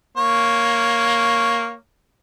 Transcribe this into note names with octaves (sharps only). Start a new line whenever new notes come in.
A#3 C#5